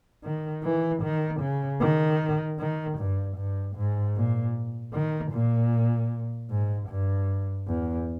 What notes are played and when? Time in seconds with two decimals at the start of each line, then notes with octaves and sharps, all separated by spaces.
0.24 D#3
0.64 E3
1.03 D#3
1.41 C#3
1.80 D#3
2.59 D#3
2.98 G2
3.37 G2
3.76 G#2
4.16 A#2
4.93 D#3
5.32 A#2
6.50 G#2
6.88 G2
7.67 E2